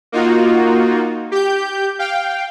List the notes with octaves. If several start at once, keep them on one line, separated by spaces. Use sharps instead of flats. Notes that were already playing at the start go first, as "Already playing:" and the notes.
A#3 D#4 F4 F#4
G4 G6
F5 G5